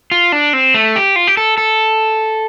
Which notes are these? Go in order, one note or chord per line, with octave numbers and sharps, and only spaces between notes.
F4
D4
C4
A3
G4
F4
G4
A4
A4